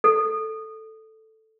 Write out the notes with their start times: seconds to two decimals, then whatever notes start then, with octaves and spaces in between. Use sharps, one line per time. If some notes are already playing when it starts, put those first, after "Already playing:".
0.04 A4